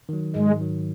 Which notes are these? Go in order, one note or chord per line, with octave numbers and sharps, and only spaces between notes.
D#3 F#3
G#2 G#3
D#3 F#3